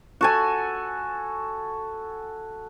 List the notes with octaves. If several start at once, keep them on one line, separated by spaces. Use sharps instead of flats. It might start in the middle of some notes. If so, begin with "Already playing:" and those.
F#4 A4 G#5